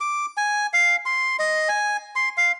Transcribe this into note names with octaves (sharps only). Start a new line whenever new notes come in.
D6
G#5
F5
C6
D#5
G#5
C6
F5